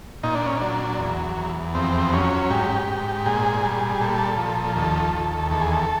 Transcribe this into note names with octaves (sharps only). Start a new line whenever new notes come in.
A#2 D#4
D4
C#4
F#3 D4
E2
E2
F2 C4
F#3 C#4
G#2 G4
G#2
A#2 G#4
G3
A#2 A4
F3
D#2 A4
D#2
E2 A4
G#4
A4